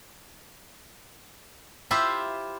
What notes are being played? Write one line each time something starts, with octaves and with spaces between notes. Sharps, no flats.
E4 F4 G4 C5 E5